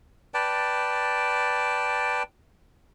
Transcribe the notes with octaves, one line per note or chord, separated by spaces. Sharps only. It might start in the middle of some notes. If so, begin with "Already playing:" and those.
B4 D5 G5 A5